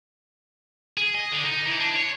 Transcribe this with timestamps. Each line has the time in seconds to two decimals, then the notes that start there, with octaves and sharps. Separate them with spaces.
0.97 G#4
1.15 D#5
1.32 D3
1.44 D#4
1.66 E3
1.80 D4
1.96 C#5